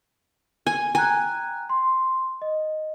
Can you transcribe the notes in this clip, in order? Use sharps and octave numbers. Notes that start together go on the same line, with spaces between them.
G#5
G5 G#5 A#5 F#6
C6
D#5